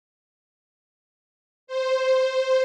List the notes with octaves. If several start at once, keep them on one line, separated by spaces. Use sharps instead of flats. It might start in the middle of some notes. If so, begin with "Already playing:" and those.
C5